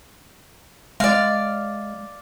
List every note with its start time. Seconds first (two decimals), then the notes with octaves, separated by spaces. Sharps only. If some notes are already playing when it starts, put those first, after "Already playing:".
1.00 G#3 D5 F5